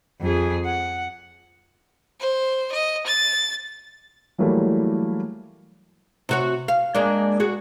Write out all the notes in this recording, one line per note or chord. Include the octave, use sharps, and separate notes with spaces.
F2 G#4
F#5
C5
D#5
A6
E3 F#3 G3 A3 A#3 E4
C3 F#4 C#5
F5
G#3 A#3 D4
F#4 G#4